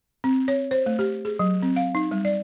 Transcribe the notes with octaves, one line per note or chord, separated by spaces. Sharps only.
C4
C#5
C5
A3
G4
G#4
F#3
C4
F5
D#4
G3
D5